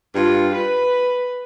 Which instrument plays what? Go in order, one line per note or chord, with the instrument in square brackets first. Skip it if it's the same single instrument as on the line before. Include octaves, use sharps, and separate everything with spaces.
[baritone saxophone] G2 [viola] F4
[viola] B4